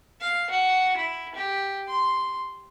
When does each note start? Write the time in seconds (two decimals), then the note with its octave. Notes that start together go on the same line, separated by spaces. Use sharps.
0.21 F5
0.50 F#4
0.97 E4
1.34 G4
1.87 C6